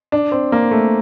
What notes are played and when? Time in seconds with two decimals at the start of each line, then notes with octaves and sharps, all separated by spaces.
0.12 D4
0.32 C4
0.52 A#3
0.71 A3